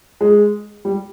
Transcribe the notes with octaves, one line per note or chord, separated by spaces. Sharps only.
G#3
G3